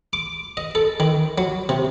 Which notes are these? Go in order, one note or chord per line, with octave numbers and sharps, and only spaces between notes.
D6
D#5
A4
D#3
F#3
C3